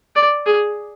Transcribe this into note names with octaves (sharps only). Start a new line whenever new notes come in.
D5
G#4